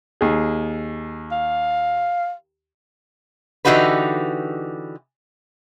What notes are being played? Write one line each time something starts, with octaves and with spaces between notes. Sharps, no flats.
D#2 G#4
F5
D3 E3 D#4 F#4 G4 B4